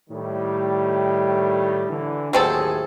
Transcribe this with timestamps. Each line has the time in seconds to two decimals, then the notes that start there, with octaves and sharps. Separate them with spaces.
0.10 A2 D#3 G3
1.89 D3 E3
2.33 D#2 A2 F#3 C4 G#4 A4